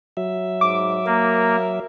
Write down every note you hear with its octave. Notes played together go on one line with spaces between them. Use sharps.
F#3 E5
G#2 D6
A#3 A#4